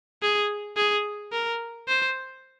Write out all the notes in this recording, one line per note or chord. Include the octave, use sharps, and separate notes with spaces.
G#4
G#4
A#4
C5